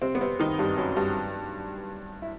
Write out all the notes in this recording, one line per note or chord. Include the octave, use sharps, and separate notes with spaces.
C3 C4
B3
C3 C4
D#3 D#4
G2 G3
F#2 F#3
G2 G3
E4